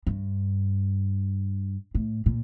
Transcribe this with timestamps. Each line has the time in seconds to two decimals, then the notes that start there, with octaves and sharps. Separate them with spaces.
0.07 G2
1.95 A2
2.26 A#2